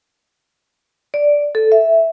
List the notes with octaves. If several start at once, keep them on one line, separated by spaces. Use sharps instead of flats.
D5
A4
E5